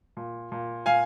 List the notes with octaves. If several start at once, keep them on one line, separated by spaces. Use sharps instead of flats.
A#2
A#2
A#2 F5 G#5